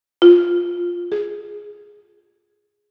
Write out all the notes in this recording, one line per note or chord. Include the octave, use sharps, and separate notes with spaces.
F4
G#4